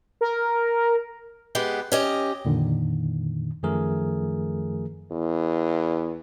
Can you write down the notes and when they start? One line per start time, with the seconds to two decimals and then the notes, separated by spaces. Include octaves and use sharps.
0.21 A#4
1.55 G#3 B3 G4
1.92 C#4 G4 D#5
2.45 F2 A#2 D3 D#3
3.63 F#2 D#3 F3 A3 G#4 A#4
5.11 E2